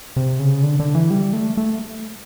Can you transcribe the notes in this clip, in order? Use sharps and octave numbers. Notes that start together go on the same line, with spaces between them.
C3
C#3
D3
D3
E3
G3
A3
A3